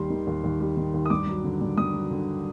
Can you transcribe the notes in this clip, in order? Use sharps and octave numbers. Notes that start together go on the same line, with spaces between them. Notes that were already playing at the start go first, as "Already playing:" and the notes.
Already playing: D#2 G3 C6
D#3
D#2
D#2
G3
D#3
D#2
D#6
G2 D6
F#3
D3
G2
G2 D#6
F#3
D3